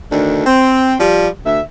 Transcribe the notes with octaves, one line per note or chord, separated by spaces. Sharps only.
D2 D#3 D4
C4
F3 G3
D2 E5